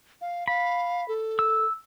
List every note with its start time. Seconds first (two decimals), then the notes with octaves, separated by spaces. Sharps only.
0.21 F5
0.48 F5 B5
1.08 A4
1.39 E6